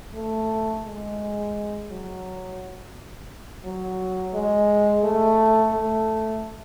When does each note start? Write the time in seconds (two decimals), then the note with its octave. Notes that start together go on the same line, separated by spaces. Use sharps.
0.14 A3
0.85 G#3
1.90 F#3
3.64 F#3
4.34 G#3
5.04 A3
5.73 A3